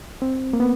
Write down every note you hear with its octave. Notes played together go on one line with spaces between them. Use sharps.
C4
A#3
B3